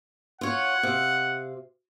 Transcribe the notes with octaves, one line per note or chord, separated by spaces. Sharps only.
F4 C#5 F#5
C3 F5